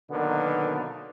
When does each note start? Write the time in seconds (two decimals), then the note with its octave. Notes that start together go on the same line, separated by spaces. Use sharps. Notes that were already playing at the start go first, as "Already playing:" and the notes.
0.11 B2 D3 D#3 F#3 A#3 B3